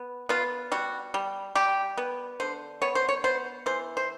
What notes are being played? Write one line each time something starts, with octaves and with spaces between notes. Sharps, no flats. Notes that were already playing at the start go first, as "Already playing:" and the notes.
Already playing: B3
B3 F4
G3 F#4
G3
G3 G4
B3
D3 C5
B3 C#5
C5
C#5
B3 C5
E3 C5
C5